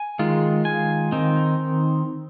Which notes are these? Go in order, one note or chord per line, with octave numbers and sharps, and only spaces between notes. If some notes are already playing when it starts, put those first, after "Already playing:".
Already playing: G#5
D#3 G#3 F4
G#5
D#3 C4 D#4